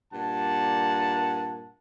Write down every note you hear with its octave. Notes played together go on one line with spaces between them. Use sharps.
G2 A#2 F#5 A5